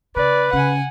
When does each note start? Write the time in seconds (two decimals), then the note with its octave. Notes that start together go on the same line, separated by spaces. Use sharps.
0.16 C#3 B4 D5
0.53 C#3 F#5 G#5